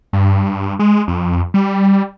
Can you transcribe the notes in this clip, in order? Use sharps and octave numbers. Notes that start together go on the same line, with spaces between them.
G2
G#3
F2
G3